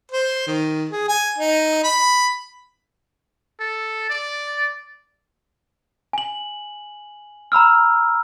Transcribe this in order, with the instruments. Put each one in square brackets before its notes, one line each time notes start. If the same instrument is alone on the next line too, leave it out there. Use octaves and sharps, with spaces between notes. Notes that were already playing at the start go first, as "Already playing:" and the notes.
[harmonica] C5
D#3
G#4
G#5
D#4
B5
[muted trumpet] A4
D5
[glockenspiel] G#5 F#7
A#5 B5 E6 F6